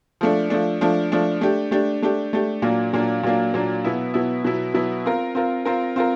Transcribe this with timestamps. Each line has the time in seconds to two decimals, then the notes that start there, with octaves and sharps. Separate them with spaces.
0.21 F3 A3 D4
0.50 F3 A3 D4
0.81 F3 A3 D4
1.12 F3 A3 D4
1.41 A3 D4 G4
1.71 A3 D4 G4
2.02 A3 D4 G4
2.33 A3 D4 G4
2.62 A#2 F#3 A#3 D4
2.93 A#2 F#3 A#3 D4
3.23 A#2 F#3 A#3 D4
3.54 A#2 F#3 A#3 D4
3.84 B2 F#3 B3 E4
4.14 B2 F#3 B3 E4
4.44 B2 F#3 B3 E4
4.74 B2 F#3 B3 E4
5.05 C4 F4 A#4
5.35 C4 F4 A#4
5.65 C4 F4 A#4
5.96 C4 F4 A#4